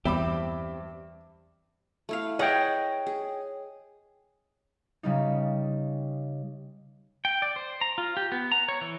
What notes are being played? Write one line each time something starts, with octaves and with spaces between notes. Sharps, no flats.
E2 G2 G3 C4 G4 E5 B5 D6
A3 E4 F5
G#4 B4 C#5 D#5 F#5 G5
G#4
C#3 G3 D#4
G5
D5
C5
A#5
F4
G4
B3
A#5
C#5
E3